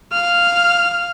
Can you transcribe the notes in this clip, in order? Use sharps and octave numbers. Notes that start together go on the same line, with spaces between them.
F5 F6